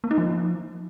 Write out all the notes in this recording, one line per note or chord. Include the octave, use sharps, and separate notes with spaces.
A#3
D#4
F3